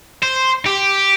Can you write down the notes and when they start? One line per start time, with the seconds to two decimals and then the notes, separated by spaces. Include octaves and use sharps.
0.23 C5
0.66 G4